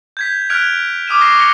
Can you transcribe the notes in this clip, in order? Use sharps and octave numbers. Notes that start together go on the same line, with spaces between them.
G6 G#6 B6
F6 F#6 G#6 B6 D7 F7
D6 D#6 F6 D#7 E7
C#6 D6 A#6 C7
A#6 C#7 G7